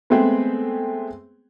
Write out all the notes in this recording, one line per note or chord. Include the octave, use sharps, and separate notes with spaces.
G#3 A3 B3 C4 G#4 G5